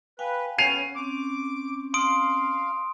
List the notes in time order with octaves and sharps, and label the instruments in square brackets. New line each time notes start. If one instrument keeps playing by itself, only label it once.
[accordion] B4 [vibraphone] F5 G5 G#5
[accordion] B3 C#4 [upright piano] C7 D#7 F7
[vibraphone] C4 C#4 [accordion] D6
[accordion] F5 [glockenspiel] C6 D#6 D7